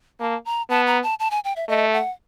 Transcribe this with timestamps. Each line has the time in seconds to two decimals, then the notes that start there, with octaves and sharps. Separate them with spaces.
0.20 A#3 A5
0.45 A#5
0.70 B3 A5
0.87 A#5
1.03 A5
1.20 A5
1.31 G#5
1.44 G5
1.56 E5
1.68 A3 D#5
1.93 F#5